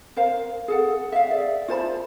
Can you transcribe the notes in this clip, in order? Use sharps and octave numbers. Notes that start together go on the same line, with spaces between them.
A#4 C5 F5
G#4 A4 F#5
E5 F5
G#4 D5 E5
F4 C5 A5 B5